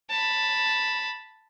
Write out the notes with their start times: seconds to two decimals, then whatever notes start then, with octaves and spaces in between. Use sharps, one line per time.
0.10 A5 B5